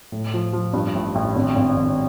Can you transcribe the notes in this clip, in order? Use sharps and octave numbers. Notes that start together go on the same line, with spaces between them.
A2
F3
F3
G2
A1
A1
G#1
G#1
G#1